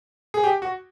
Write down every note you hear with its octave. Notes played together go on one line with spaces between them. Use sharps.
G#4
G4
F#4